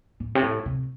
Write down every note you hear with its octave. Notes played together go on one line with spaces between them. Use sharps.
A2
C3
A2
C3